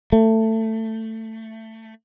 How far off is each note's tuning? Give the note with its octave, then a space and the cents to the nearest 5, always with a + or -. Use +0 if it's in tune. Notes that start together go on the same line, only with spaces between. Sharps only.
A3 +15